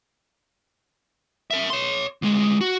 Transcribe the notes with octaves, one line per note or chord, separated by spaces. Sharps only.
A#4 E5
C#5 C6
D2 G#3
F#4